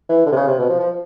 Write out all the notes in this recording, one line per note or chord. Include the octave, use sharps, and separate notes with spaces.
E3
D3
C3
C#3
C3
B2
F3
F3